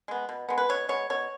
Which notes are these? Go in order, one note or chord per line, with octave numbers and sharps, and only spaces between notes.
G#3 B3
B2
G#3 B3
B4
B2 C#5
G#3 B3 C#5
B2 C#5